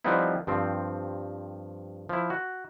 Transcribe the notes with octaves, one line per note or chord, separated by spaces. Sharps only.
F3 G3 B3 C4 D#4 E4
G2 F3 C4
F3 E4
F#4